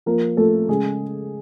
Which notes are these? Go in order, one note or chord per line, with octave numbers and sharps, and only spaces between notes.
F3 A#3 A#4
F3 A3 A4
C#3 G#3 G#4